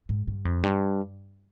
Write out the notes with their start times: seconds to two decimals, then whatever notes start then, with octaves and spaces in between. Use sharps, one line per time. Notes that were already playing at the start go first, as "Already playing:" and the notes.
0.09 G#2
0.28 G2
0.45 F2
0.63 G2